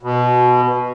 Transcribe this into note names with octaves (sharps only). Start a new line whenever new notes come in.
B2